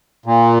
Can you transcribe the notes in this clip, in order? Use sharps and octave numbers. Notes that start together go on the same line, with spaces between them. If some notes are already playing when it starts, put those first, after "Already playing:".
A#2